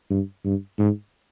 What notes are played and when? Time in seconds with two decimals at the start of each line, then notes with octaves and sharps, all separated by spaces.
0.10 G2
0.45 G2
0.79 G#2